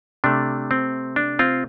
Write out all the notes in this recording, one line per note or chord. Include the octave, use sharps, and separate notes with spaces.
C3 A3 D4
C4
D4
C4 F4